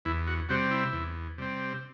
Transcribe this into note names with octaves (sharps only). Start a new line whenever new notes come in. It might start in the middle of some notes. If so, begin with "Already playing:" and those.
E2 E4
F#4
C3 G3 C4 F#4
E4
E2
C3 G3 C4